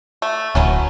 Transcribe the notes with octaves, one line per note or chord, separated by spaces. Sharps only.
A3
D1 F#3 B3 C#4